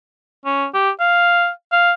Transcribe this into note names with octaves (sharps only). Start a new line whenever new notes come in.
C#4
G4
F5
F5